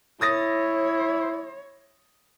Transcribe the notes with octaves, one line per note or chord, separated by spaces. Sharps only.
E4 C#5 D#6 A6 A#6